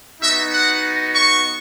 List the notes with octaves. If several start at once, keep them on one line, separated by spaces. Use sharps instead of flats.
B3 D#4 F#4 E5
F#5
C#6